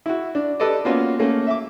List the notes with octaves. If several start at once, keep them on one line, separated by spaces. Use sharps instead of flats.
E4 F#4
D4
G4 A4 B4 D5 D#5
A#3 B3 C#4 F4 F#4
A3 A#3 C#4
E5 D6